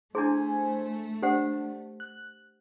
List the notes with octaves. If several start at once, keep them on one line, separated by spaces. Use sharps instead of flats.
A3 D4 E4 G#4 C5 G#5
D4 G4 C5 F#5
F#6